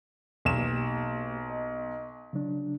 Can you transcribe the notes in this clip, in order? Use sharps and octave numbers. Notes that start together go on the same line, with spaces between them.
B1 A#3 G4 E7
D#5
C#3 F#3 D4